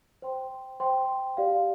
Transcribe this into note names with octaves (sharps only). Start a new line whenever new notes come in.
C5 G5 C6
C5 G5 C6
G4 D5 F5